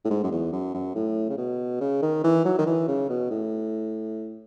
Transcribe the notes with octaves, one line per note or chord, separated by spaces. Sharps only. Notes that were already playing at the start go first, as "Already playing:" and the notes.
A2
G#2
F#2
E2
F#2
F#2
A2
C#3
B2
C#3
D#3
E3
F#3
D#3
E3
C#3
B2
A2